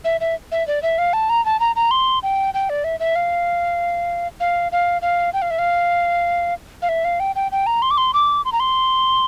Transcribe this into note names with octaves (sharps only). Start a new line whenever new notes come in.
E5
E5
E5
D5
E5
F5
A5
A#5
A5
A#5
A#5
C6
G5
G5
D5
E5
E5
F5
F5
F5
F5
G5
F5
E5
F5
F5
E5
F5
G5
G5
G5
A#5
C6
D6
C6
D6
C6
A#5
C6